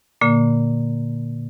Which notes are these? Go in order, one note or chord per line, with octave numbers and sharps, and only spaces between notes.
A#2 D3 A#3